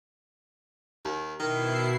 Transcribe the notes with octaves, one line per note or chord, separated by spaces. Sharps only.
D#2
B2 D#3 E4 C7